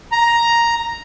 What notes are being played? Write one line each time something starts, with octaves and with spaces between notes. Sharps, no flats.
A#5